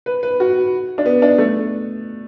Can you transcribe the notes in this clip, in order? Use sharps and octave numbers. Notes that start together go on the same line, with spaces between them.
B4
B4
F#4
D4
B3
D4
A3